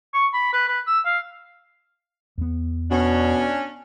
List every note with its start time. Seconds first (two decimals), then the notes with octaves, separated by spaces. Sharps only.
0.14 C#6
0.33 B5
0.53 B4
0.68 B4
0.87 E6
1.05 F5
2.38 E2 B3
2.91 B2 C#4 D4